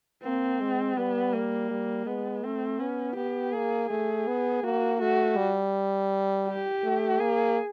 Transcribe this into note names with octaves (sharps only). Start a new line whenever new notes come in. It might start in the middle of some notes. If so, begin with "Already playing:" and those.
A#3 C4
G#3
G3 B3
A#3
G3
G#3 B3
A3 C4
B3 C#4
B3 G4
A#3 G#4
A3 G#4
B3
A#3 F#4
A3 F#4
G3
G4
A3
A#3 G#4